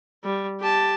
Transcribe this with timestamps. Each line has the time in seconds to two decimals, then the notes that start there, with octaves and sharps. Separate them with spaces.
0.23 G3
0.60 G4 A5